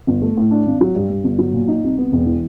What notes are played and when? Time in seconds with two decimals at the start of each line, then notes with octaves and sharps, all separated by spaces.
0.07 G1
0.22 A3
0.37 A2
0.51 D4
0.66 G#1
0.81 F#3
0.95 G2
1.10 G2
1.24 G1
1.38 F#3
1.53 A#2
1.68 D#4
1.83 C2
1.97 B3
2.12 E1
2.26 E3